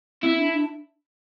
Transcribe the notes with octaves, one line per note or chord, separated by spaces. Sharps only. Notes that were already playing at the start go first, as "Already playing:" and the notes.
C4 E4
D4
D4